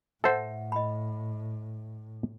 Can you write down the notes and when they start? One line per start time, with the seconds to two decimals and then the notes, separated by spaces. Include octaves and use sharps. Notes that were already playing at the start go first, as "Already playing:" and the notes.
0.24 A2 A4 C5 E5 F#5
0.72 D#5 B5